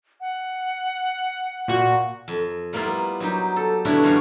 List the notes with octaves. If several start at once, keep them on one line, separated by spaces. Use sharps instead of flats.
F#5
A#2 F#4
F2
G3 A#3 B3 E4 F4
F#3 D#4 G4
A4
B2 D3 D4 E4 C#5
F#2 G3 F#4 C#5 F5 G5